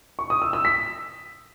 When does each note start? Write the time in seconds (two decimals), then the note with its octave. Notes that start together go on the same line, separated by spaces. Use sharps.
0.19 C#6
0.30 D#6
0.42 E6
0.53 E6
0.65 B6